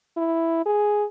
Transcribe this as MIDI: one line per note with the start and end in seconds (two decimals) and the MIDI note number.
0.17 0.64 64
0.66 1.05 68